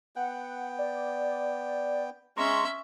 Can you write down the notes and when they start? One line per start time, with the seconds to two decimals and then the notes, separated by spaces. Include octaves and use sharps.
0.16 B3 F#5 G5
0.79 D5
2.37 G#3 C#4 E5 A#5 C6 C#6